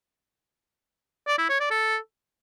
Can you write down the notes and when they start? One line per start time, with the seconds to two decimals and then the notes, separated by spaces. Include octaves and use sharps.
1.27 D5
1.38 E4
1.49 C#5
1.60 D5
1.71 A4